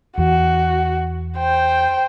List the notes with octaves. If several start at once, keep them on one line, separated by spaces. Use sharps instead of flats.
E2 E3 F#4
C5 G5